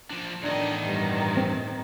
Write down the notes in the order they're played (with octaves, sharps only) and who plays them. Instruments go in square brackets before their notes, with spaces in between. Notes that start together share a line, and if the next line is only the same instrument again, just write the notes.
[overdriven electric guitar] F3 D4
[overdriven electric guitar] E2 D#5 [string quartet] A2 D#3 [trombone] D4
[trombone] G2
[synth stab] C4